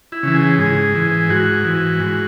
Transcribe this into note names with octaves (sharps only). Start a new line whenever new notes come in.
E4
C#3 E3
G#4
G#2 G#4
E3
G#2 F#4
E3
G#2